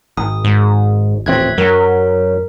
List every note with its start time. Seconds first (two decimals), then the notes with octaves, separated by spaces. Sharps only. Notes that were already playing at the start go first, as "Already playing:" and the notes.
0.17 G#1 D#6
0.45 G#2
1.26 D#1 A1 C4 E5 F#6 G#6
1.58 F#2 F#3 A#4